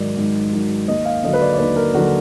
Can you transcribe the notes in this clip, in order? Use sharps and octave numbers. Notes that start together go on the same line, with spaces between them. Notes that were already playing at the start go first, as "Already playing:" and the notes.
Already playing: G#2 D#3 F#3 D5
G#2
D#3 F#3
D#2 D#5
F5
D3 F#3 D#5
B4
D5
D5
D#2 B4
A#4
D3 F#3 F#4